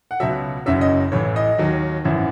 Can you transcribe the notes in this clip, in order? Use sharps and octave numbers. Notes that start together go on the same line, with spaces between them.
F#5
C#2 B2 F#3 E5
F#1 F#2 C#3 F#3 E5
D#5
A1 A2 E3 C#5
D#5
D#2 D#3 F#3
G#1 F#2 E3 E5